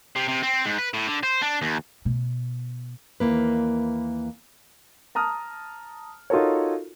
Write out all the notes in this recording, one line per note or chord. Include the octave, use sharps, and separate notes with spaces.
C3
C3
C4
G#2
B4
A2
D3
C5
D4
D#2
B2
D#2 B2 E3 A#3 B4
A5 A#5 D#6 F6
D#4 F4 F#4 A4 A#4 C#5